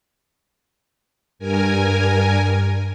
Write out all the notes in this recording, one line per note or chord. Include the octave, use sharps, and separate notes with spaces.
G2 A#4 G#5